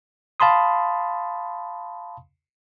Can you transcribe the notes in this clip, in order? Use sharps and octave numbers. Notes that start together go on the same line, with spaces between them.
F5 A5 B5 C6 D#6